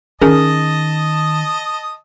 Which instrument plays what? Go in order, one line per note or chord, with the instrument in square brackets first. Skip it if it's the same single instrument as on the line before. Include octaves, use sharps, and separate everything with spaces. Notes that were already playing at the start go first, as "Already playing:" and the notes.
[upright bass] D#3 [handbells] C#4 G#4 A#4 [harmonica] D#5 A5 D#6